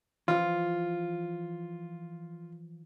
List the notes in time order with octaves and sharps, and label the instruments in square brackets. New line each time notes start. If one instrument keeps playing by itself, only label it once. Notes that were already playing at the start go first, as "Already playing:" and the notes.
[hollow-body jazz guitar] E3 F3 [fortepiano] F4